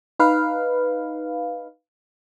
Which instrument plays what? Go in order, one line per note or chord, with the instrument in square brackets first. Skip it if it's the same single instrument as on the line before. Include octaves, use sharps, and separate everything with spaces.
[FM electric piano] D#4 B4 F5